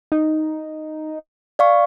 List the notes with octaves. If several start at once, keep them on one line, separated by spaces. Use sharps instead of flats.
D#4
D5 F5 C#6